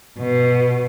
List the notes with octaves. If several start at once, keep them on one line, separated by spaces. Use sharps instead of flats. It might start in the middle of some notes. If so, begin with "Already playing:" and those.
B2